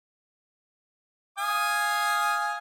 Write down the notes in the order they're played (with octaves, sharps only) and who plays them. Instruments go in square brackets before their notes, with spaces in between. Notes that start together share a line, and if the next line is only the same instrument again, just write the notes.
[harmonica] F5 G#5 D#6